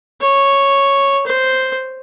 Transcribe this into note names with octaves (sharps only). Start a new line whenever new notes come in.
C#5
C5